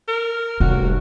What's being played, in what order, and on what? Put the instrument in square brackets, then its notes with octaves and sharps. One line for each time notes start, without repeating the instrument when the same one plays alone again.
[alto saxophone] A#4
[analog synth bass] F1 [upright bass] G3 [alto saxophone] F#4